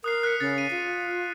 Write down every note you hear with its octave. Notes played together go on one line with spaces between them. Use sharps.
A#4 D#6 F#6 C7
F#6 B6 C#7
C#3 A6
D#7
F4